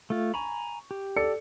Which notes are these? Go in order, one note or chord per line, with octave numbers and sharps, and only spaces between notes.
A3 F4
G#5 A#5 B5 C#6
G4
A4 D5 C#7